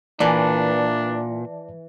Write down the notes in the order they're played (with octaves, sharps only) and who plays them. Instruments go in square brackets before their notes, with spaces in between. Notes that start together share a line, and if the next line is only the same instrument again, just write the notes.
[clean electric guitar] A#2 [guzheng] E3 [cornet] D4 [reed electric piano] D5 A5